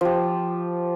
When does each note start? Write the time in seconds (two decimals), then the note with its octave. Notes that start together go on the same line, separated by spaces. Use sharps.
0.01 F3 G4